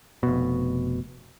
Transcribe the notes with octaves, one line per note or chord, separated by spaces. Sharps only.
F1 B2